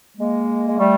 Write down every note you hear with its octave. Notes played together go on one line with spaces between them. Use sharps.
G#3 A#3
G#3
G3 A3